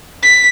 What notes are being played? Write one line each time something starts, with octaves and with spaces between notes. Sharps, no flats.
B6